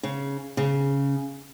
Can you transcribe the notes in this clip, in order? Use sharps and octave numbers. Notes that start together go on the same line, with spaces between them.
C#3
C#3